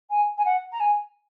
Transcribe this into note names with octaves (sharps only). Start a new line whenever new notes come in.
G#5
G#5
F#5
A#5
G#5